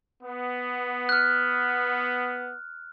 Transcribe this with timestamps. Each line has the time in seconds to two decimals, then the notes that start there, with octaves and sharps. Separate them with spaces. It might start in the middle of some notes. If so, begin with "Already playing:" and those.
0.23 B3
1.09 F6 F#6